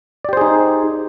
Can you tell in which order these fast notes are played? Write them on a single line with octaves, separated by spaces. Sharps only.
D5 G4 C5 G#4 D#4